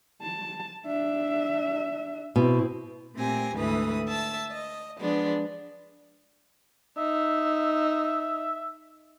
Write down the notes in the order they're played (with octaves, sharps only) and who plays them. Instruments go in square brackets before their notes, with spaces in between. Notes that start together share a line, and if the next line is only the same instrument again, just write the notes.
[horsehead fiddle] A5
D4 E5
[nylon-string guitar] B2 [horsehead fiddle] C4 E4
[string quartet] A#2 A3 C4 G4 G#5 A#6
D2 G#2 E3 A4 B4 D#6
E5 A5 E6
D#5
F3 G#3 B3 D4
[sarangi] D#4 [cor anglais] E5